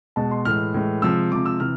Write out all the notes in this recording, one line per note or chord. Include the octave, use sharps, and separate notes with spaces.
B2 G#3 A5
C6
A2 E3 G#3 F6
A2 E3 G#3
C3 F3 G#3 E6
C3 F3 G#3 D6
E6
C3 E3 F6